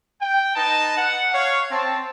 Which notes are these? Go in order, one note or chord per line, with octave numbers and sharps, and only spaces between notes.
G5
D#4 B4 D#5 A5
F#5
C#5 F5
C4 A5